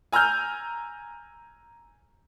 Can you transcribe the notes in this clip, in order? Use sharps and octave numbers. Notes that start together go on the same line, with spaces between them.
G#5 A#5 E6 F6 G6